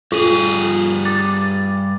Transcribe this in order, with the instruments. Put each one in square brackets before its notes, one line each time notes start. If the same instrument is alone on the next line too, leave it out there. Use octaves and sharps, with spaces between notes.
[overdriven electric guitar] G2 G#4 [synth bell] F4
[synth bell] D6 A6